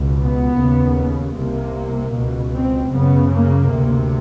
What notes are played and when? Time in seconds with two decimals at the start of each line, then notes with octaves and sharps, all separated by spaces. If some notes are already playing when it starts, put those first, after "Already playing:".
Already playing: C#2 B2
0.20 B3
0.59 D#2 C#3
1.36 C2 C3 A#3
2.14 C#2 B2
2.53 C4
2.92 F#2 C#3 B3
3.30 A#3
3.69 D2 C3